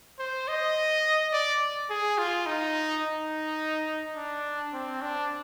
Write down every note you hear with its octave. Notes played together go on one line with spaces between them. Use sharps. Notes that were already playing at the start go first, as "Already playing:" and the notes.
C5
D#5
D5
G#4
F4
D#4
D#4
D4
C4
D4